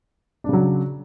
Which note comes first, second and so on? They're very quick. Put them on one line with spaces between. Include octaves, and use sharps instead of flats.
D4 C#3 F#3